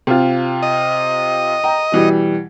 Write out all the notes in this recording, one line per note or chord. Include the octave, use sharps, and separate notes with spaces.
C3 F4
D#5
G5 A#5
B2 E3 G3